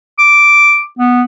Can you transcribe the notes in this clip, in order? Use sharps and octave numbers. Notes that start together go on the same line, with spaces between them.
D6
B3